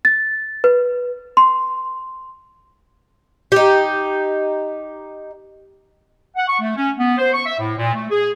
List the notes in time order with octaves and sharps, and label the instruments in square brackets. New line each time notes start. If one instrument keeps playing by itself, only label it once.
[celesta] A6
B4
C6
[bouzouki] D#4 G4
[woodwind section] F#5
C#6
A3
C#4
B3
C5
C#6
E5
A2
A#2
A3
G#4